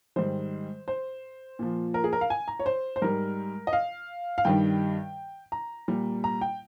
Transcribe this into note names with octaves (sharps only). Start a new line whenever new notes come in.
G#2 D#3 G3 C5
C5
A#2 F3
A#4
G#4
A#4
F5
G#5
A#5
C#5
C5
C5
G#2 G3 A#4
D#5
F5
F5
G2 D#3 G3 G5
A#5
A#2 G3
A#5
G5